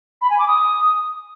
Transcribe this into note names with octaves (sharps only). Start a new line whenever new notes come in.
B5
G#5
D6
D#6